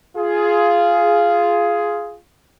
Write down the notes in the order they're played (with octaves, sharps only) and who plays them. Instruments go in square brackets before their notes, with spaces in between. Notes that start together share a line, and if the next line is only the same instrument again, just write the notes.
[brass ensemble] F4 G#4